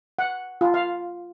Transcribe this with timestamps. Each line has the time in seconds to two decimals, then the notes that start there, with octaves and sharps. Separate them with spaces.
0.19 F#5
0.61 F4
0.74 F5